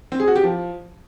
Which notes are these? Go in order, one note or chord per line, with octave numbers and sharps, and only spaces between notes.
C4
G#4
F#4
G4
F3